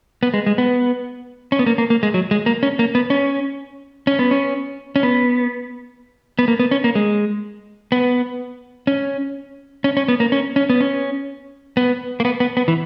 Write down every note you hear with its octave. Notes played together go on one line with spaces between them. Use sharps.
B3
G#3
G#3
B3
C#4
B3
A#3
A#3
A#3
G#3
F#3
G#3
A#3
C#4
A#3
B3
C#4
C#4
B3
C#4
C#4
B3
B3
A#3
B3
C#4
A#3
G#3
B3
C#4
C#4
C#4
B3
A#3
C#4
C#4
B3
C#4
B3
A#3
B3
B3
B3
E3